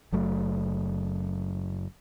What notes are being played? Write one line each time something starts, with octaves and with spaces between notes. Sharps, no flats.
F#1 F#3 A3